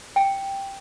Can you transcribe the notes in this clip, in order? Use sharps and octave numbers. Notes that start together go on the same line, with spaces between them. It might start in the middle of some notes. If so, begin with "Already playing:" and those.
G5